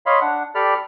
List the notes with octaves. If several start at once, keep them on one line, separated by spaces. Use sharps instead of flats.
C#5 D#5 F5 B5 C6
D4 F#5
G4 A4 D5 B5 F6